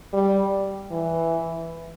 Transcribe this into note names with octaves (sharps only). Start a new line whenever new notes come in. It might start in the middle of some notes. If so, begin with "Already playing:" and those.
G3
E3